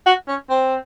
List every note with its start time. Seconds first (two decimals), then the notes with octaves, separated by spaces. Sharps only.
0.06 F#4
0.28 C#4
0.50 C4